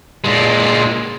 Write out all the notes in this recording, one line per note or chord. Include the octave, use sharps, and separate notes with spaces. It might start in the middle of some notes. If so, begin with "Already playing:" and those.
A#2 G#3